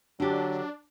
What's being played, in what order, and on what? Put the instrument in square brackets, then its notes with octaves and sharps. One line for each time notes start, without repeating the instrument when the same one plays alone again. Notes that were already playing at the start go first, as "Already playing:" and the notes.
[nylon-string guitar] D3 G4 [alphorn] F#3 [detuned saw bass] D4